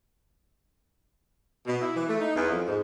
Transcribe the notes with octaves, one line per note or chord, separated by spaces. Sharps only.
B2
E4
E3
A3
D#4
E2
F2
G#2